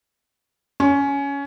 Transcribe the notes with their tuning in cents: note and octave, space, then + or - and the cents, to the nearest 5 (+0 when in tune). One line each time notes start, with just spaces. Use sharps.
C#4 +15